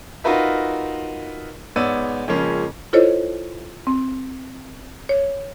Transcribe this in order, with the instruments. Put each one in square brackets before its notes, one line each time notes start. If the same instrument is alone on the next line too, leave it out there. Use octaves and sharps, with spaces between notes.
[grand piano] D#4 F4 F#4 A#4 B4 E5
G#2 B3 C#5 D5 E6 D#7
F2 C#3 F3 G#3 A#3 C#4
[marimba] E4 F4 A4 C5 C#5 D#5
C4
C#5